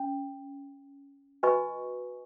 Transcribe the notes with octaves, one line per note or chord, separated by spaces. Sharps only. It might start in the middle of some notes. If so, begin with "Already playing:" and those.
Already playing: C#4
F#4 B4 D#5 G#5 C#6